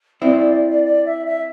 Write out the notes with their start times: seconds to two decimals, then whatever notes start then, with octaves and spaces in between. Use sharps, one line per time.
0.22 C4 E4 D5
0.37 D5
0.53 D5
0.69 D5
0.85 D5
1.05 E5
1.26 E5